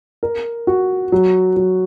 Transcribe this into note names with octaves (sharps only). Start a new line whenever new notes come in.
A#4
F#4
F#3
F#3